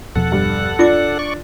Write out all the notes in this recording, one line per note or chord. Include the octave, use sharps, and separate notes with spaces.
E2 B2 F3 A4 F#5
G2
D4 F4 D6
D5 C#6